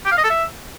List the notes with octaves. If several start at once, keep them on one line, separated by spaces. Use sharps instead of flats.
G4
F5
D#5
A4
E5